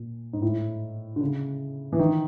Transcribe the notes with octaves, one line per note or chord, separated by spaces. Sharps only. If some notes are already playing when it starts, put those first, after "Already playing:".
Already playing: A#2
G#2
A2
D3
C#3
E3
D#3